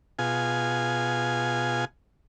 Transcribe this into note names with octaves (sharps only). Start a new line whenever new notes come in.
B2 F4 G#4 G#5